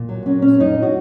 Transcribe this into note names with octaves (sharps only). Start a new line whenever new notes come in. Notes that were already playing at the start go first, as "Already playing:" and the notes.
Already playing: A#2
F#3
F#3 C#4
A#2 C#4
F#2 D#4
F#4